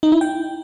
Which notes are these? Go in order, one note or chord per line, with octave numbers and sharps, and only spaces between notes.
D#4
E4
G5